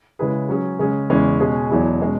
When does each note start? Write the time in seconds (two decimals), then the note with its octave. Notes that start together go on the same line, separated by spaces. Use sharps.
0.19 C#3 G#3 E4 G#4 B4
0.49 F#3 C#4 G#4
0.79 C#3 G#3 C#4 G#4
1.10 E2 C#3 G#3 C#4 E4
1.40 B2 G#3 C#4 G#4
1.71 E2 B2 F#3 E4 G#4
2.01 B2 G#3 C#4